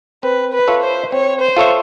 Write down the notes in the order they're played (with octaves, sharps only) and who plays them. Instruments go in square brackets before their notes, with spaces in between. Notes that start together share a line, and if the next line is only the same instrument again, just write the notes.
[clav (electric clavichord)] C4 [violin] B4
[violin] B4
[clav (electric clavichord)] F4 A4 C#5 E5
[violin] C5
[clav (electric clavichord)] C4 [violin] C#5
[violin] C5
[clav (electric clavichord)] F4 A4 C#5 E5